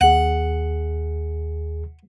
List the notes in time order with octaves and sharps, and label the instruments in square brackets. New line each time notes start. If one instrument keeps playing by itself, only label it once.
[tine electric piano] D#2 G#4 [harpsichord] F#5